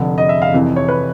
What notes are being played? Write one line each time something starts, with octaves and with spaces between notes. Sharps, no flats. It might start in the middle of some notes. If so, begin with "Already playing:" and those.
Already playing: F1 F2 D3
D#5
E5
F5
F1 F2 C3 E3
C#5
B4